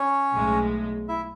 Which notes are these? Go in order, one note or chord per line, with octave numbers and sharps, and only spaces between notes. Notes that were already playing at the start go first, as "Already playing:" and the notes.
Already playing: C#4 C#5
B1 A2 G#3
E4 E5